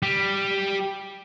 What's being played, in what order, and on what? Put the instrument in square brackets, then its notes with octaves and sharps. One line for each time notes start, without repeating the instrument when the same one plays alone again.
[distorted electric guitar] G3